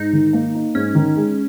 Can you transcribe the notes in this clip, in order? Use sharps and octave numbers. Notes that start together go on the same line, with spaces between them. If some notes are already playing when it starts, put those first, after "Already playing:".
Already playing: G#2 D#4
D#3
A#3
D#4
G#2 C#4
D#3
G#3